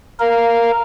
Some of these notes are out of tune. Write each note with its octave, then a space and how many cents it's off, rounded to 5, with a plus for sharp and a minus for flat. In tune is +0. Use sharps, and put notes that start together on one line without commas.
A#4 +0 F5 -10